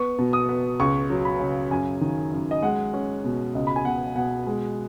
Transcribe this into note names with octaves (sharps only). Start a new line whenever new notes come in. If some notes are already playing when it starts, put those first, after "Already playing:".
Already playing: B3 C#6
B2
D#6
B3
C#2 C#6
F#3
B5
C#3
F#2 G#5
D#3
F#2
D#5
G#3 F#5
C#4
B2
C#2 D#5
B5
G#5
B2 F#5
B2 F#5
G#3